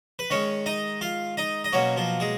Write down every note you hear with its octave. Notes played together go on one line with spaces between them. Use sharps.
B4
D#3 G#3 C#4 C#5
D#4 D#5
F4 F5
D#4 D#5
D#5
B2 F#3 A#3 C#4 C#5
F3 F4
G#3 G#4